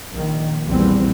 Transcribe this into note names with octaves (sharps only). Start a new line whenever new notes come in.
A#1 D#3
A#1 E2 E3 G3 C4